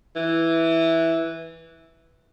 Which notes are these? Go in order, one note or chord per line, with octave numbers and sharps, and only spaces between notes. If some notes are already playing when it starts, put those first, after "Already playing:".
E3